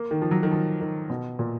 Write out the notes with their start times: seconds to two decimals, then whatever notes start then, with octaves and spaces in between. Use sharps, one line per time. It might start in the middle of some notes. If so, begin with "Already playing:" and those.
Already playing: A#3
0.11 D#3
0.22 F3
0.31 F#3
0.43 D#3
0.52 F3
0.81 D#3
1.10 B2
1.39 A#2